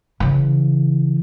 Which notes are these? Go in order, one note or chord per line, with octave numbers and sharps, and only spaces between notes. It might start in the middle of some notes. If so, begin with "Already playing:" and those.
C#3 E3